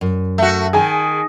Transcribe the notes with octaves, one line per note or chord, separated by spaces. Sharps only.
F#2
A3 F#4
D#3 G#4 G#5